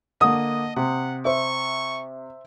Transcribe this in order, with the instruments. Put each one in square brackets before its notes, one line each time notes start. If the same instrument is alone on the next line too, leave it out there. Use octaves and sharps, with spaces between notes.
[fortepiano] D3 A#3 [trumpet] D#5 [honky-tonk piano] D#6
[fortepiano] C3 [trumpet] F#5
[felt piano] C5 E5 [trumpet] C#6